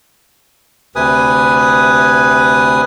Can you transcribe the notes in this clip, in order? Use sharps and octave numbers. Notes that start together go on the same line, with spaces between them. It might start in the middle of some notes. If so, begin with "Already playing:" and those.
D2 C3 B4 G#5 D#6